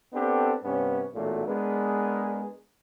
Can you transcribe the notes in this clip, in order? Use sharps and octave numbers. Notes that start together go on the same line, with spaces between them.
B3 C4 D4 G4 A4
G2 C3 B3 C#4
B1 E2 A#2 F#3 A3
G#3 B3 D4 G#4 A#4 B4